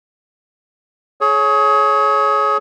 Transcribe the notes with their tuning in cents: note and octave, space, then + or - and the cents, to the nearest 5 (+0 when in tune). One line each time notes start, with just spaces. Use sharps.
G#4 +30 C#5 +0